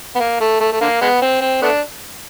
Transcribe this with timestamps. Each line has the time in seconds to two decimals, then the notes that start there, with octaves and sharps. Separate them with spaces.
0.15 B3
0.20 A#3
0.41 A3
0.61 A3
0.72 A3
0.81 D3 A#3
1.01 G#3 B3
1.22 C4
1.41 C4
1.62 A3 B3 D4